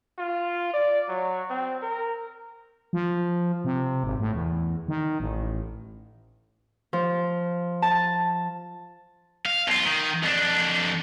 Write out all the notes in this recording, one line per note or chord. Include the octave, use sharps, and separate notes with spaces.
F4
D5
F#3
C4
A#4
F3
C3
G#1
A2
E2
D#3
A1
F3
A5
F5
B1 F4
D#3
F2 D4